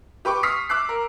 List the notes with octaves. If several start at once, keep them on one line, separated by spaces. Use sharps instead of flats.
G4 B4 G5 C#6 D6
C#6 D#6 F6 B6 C7
D6 E6 F#6 C7
A#4